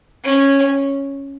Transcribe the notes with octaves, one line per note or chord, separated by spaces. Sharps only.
C#4